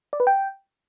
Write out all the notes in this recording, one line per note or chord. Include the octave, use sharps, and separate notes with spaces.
D5
B4
G5